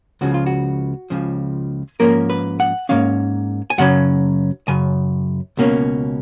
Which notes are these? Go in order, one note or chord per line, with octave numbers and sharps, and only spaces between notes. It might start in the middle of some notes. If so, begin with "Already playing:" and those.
C#2 C#3 F3 F#4
F4
F#4
C#2 C#3 F3
G#2 F3 A#3 C#4 A#4
B4
F#5
G#2 F3 A#3 C#4 F5
G#5
F#2 C#3 F#3 C#4 F#5
F#2 C#3 G#5
C#2 B2 A#3 C#4